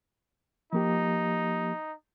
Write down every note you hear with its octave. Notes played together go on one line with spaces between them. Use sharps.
F3 A#3 D#4 G4